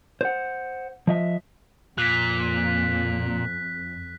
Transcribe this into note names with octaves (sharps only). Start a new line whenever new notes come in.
C5 F#5
F3 D#5 E5
F2 A#2 F#6 B6